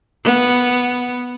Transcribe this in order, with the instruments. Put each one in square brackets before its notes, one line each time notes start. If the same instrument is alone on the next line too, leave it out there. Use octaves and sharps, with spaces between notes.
[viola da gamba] B3